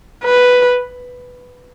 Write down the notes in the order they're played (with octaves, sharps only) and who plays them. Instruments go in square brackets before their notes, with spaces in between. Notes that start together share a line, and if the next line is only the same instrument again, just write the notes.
[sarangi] B4